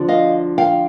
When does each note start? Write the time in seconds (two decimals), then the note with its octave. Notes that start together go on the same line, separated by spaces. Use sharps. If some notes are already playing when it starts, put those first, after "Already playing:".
Already playing: D2 D3 F3
0.08 D#5 F5
0.58 F5 G5